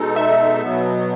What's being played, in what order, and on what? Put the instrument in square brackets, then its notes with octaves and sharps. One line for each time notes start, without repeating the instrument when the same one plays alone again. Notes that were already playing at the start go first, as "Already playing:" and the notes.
Already playing: [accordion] B2 G#3 D#4 A4
[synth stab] E5
[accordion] B2 F#3 B3